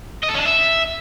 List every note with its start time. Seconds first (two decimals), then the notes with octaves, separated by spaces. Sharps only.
0.24 D#5
0.29 A4
0.35 C#4
0.40 D4
0.46 E5